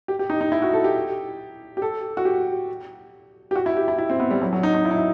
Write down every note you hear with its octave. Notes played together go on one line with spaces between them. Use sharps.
G4
G4
D#4
D#4
E4
F#4
A4
G4
G4
A4
F#4
G4
G4
F#4
E4
G4
E4
E4
C4
B3
G3
F#3
F#3
D#4
D#4
E4
D#4
E4